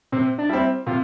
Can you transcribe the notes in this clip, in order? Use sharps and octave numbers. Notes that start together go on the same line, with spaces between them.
C3 C4
D4
G3 C4 E4
C3 F4